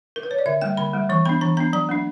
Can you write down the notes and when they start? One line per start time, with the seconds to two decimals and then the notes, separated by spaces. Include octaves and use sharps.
0.16 A#4
0.23 B4
0.31 C#5
0.39 D5
0.46 D3 E5
0.61 G3 A#3 G5
0.77 D3 B5
0.94 G3 A#3
1.09 E3 C#6
1.25 B3 D4 B5
1.41 E3 A#5
1.57 B3 D4 A#5
1.73 F#3 A#5
1.89 A#3 D4